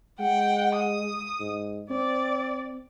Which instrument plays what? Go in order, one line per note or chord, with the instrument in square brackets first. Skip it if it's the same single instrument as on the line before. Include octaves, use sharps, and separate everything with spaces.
[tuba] G#3 [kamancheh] F#5 G5
[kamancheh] D#6
[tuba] G#2
[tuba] C4 [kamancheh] D5